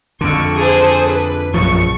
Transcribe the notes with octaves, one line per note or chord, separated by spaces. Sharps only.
F2 D3 C#6
G#4 A4 C5
B4
A#1 F#2 F3 C#6